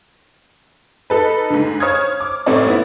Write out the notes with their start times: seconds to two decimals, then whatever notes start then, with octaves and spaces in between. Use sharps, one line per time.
1.10 D#4 A4 B4
1.50 G#2 D3
1.80 C5 C#5 D#6 F6 G#6
2.20 D6
2.46 A1 A2 A3 C4 C#5 D5
2.66 B3 E4